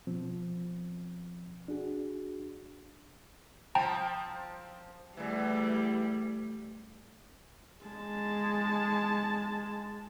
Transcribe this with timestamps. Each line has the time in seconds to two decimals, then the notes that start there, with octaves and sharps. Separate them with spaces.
0.07 B2 F3 C4
1.68 D4 F#4 G#4
3.75 F3 C4 G5 A5 A#5
5.17 E2 E3 G3 A3
7.85 G#3 A5